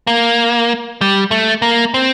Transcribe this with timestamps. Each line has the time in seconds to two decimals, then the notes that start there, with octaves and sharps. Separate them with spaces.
0.07 A#3
1.01 G3
1.31 A3
1.62 A#3
1.94 C4